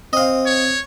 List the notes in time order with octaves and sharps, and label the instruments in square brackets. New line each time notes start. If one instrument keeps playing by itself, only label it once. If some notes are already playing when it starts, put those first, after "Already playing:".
[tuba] C4 [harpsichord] D#5 F5
[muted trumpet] C#5